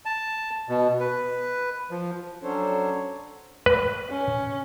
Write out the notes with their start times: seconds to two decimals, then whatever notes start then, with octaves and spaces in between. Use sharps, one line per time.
0.05 A5
0.69 B2
1.00 B4
1.91 F3
2.43 F#3 C#4 D4 A4 C5 C#5
3.66 B4
4.09 C#4